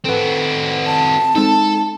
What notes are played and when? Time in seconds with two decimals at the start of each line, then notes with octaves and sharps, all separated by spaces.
0.05 C4 F#4 A4 B4
0.86 A5
1.35 G#3 C4 D#4 A4